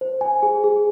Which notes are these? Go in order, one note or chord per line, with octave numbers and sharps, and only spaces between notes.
C5
G#5
G#4
G#4